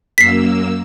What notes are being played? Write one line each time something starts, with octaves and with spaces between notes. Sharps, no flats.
F#2 A#3 E6 B6 C7